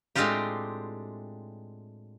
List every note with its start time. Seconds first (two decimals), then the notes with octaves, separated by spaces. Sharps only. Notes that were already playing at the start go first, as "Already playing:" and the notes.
0.15 A2 G#3 C4 D4 F4 G4